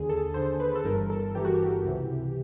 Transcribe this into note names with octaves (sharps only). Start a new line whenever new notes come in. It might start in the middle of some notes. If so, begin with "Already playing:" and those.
Already playing: D#2 D3 G#4
A4
D#2 D3 C5
B4
A4
G1 G2 E3 A#4
A4
G1 G2 E3 G4
F#4
G4
C#2 C3 E3